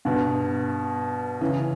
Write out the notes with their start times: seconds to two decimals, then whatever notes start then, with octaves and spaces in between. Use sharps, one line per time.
0.05 G2 B2
1.41 C#3 E3